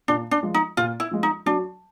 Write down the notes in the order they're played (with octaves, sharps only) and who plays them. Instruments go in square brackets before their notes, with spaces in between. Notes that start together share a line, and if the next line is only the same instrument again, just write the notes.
[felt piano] A#2 [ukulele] D4
[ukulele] D4
[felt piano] F3 G#3
[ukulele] D#4
[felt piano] A#2 [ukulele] F4
[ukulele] E4
[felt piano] F3 G#3
[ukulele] D#4
[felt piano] F#3 [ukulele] D4